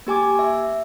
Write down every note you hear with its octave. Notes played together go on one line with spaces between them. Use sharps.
A#3 G4 G#5 D6
E5